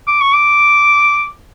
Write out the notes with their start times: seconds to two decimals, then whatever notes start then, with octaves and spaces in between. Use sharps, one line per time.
0.08 D6
0.21 C#6
0.34 D6